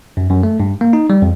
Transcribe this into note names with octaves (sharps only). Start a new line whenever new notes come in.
F#2
F#2
A3
G2
A#3
D#4
G3
F2